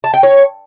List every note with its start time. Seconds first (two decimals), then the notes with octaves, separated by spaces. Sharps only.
0.04 A5
0.14 G5
0.23 C#5